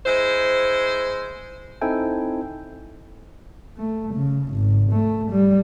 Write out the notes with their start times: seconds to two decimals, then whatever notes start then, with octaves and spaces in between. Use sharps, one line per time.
0.05 G#3 E4 C5
1.81 C4 D#4 E4 A4 G5 G#5
3.78 A3
4.15 C#3
4.50 G#1
4.92 A3
5.31 G3